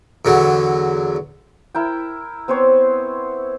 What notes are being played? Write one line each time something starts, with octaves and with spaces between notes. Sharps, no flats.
E2 D3 F#3
E4 A#4 G5
B3 C4 C5 C#5